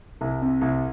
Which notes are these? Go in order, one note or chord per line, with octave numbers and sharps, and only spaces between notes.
C2
C3
C2